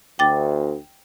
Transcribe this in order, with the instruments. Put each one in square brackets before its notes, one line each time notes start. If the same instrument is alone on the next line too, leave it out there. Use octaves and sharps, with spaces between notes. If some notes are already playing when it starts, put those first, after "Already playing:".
[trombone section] D2 [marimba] G5 D6 A6